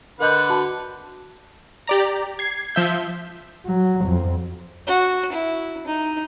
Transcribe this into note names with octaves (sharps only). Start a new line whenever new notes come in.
D3 A#4 B4 D#5 F#5 G6
F#4 A5
G4 D5 A#5
G#6 C7
F3 E5 G6
F#3
F2
F#4
E4
D#4